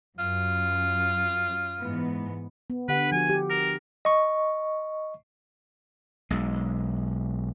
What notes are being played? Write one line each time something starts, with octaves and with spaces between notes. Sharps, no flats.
F#2 F4
G#2 E3 B3
B3
D3 G4 B4 F#5
F3 F#4 G#5
G4
A#4
D#5 C#6
B1 G#3